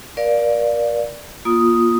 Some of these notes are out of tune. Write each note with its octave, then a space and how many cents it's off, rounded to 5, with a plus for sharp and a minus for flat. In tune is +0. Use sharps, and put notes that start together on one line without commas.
A#4 +30 D5 +0 F5 +0
A#3 +30 F4 +0 D#6 +0